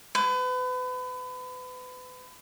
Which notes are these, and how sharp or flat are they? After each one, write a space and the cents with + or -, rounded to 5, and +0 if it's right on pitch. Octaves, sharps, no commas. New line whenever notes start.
B4 +35